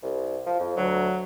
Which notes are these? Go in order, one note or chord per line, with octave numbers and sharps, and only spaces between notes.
C2
F3
F2
D2 F#3